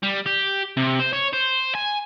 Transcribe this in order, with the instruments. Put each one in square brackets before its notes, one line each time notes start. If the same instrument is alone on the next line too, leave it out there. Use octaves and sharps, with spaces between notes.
[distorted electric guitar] G3
G4
C3
C5
C#5
C5
G#5